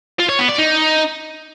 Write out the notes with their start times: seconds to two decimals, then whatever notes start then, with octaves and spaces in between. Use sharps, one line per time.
0.19 F4
0.29 C#5
0.39 B3
0.49 D5
0.58 D#4